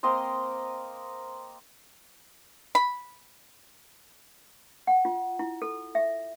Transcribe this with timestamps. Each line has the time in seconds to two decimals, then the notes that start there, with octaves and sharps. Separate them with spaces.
0.03 A#3 C4 D#5 C6
2.75 B5
4.87 F#5
5.05 F4
5.39 E4
5.62 A4
5.95 E5